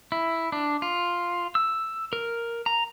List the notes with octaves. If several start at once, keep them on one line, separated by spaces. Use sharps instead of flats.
E4
D4
F4
E6
A#4
A#5